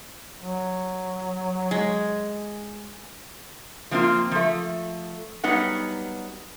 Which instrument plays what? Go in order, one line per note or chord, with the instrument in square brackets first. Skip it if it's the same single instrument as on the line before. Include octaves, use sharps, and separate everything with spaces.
[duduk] F#3
[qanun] G#3
[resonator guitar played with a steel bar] F3 A#3 C4 D#4 F4 F5
F3 A3
F#3 G3 B3 D#4 F#5